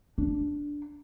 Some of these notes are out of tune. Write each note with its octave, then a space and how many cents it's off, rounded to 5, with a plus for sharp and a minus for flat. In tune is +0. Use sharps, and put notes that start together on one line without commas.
D4 -5